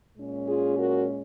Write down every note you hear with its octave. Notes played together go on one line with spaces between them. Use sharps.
A#2 G#3 C#4
F4 G#4
F#4 A#4